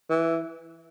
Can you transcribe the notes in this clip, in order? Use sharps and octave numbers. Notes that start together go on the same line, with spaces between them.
E3